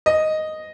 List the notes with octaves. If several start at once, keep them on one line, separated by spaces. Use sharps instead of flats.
D#5